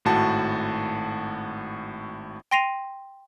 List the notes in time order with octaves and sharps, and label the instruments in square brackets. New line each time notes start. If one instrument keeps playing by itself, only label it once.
[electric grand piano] G#1 A2 F#4 A5
[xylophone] G5 C6 A#6 C7 D#7 F7